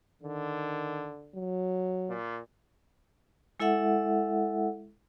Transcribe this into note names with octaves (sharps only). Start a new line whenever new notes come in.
D3 D#3
F#3
A#2
G#3 E4 A4 E5 F#5